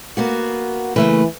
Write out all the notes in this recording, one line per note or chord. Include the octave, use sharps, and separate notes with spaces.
A#3 B3 F#4
C#3 E3 A3 A#3 B4